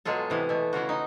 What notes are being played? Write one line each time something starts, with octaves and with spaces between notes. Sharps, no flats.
B2 F#3 G#3 F4 A4
C3 E3 B3
B2 A3
C#3 E3 F4 F#4
D#4